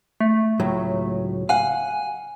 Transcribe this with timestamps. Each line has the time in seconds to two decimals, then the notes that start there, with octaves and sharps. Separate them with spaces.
0.20 A3
0.60 C#2 A2 F#3
1.49 F5 F#5 G#5